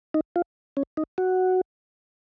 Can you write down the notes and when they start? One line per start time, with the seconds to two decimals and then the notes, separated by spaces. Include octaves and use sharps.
0.14 D#4
0.36 F4
0.77 C#4
0.97 D#4
1.18 F#4